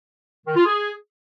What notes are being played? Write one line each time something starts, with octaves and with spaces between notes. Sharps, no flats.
D#3
F4
G#4